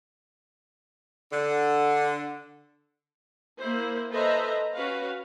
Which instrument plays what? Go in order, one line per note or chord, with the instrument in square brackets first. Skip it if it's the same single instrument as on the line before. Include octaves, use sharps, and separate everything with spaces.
[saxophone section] D3
[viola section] A#3 E4 C5
A4 B4 C5 D#5 E5 A#5
C#4 F#4 B4 F5